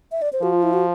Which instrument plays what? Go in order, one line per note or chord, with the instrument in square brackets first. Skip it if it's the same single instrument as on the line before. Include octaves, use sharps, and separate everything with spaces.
[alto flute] E5
D5
C5
[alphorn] F3 [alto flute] F#4
[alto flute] F4
E4
F#4